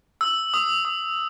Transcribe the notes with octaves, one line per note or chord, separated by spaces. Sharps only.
E6
D#6
D#6